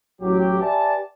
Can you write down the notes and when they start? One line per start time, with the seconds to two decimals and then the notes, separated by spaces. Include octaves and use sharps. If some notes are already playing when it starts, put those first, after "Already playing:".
0.21 A1 F#3 G4
0.61 G4 B4 D5 E5 G#5 A5